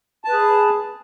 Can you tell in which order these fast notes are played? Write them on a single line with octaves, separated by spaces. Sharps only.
A5 B4 G#4